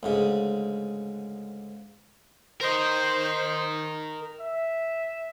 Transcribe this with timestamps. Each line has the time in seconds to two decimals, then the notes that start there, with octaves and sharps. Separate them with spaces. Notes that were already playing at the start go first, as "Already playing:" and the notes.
0.03 D2 G#2 C#3
2.61 A#4 C5 D#5
4.39 E5